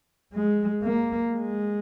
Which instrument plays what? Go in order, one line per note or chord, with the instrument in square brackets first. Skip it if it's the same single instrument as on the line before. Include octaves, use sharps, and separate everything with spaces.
[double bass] G#3
A#3
G#3